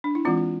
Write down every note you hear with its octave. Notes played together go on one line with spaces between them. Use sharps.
D4
E4
E3 G#3 C4 F4
F4